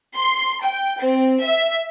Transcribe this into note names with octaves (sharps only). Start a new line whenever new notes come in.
C6
G5
C4
E5